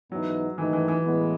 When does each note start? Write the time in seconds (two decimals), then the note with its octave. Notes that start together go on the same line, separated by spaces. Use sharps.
0.11 G#2 E3 F#3 B3 D#4
0.57 G#2 D#3 E3 A3 D#4
0.73 E3
0.88 E3
1.04 A2 G#3 B3 E4